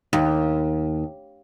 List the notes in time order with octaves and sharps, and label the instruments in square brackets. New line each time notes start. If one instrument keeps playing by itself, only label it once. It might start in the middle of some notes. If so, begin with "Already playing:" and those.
[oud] D#2